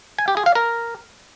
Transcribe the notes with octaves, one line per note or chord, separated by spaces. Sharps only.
G#5
G4
G#4
F5
A#4